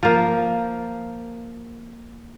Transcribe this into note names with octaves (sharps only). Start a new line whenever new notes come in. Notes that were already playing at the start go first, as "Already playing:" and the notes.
F3 A#3